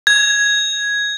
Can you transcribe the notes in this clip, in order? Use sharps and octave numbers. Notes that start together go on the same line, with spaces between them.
G#6